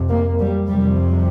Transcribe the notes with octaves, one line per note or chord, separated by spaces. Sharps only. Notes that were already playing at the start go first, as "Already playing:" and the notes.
Already playing: F2 C3
A#3
G3
F2 C3 G3